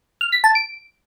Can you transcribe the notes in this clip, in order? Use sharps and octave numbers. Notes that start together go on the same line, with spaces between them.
F6
B6
A5
D7